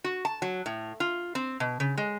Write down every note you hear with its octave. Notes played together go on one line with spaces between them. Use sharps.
F#4
A5
F#3
A2
F4
C4
B2
C#3
G#3